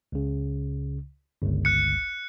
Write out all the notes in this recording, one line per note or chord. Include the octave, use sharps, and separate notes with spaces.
C#2 C#3
G1 C#2
F#6 C#7